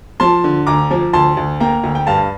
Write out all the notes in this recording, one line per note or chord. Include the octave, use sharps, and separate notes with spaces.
F3 A5 C6
D3
D2 A#5 D6
F3
D2 A5 C6
D2
A#3 G5 A#5
D2
G5
G2 F5 A5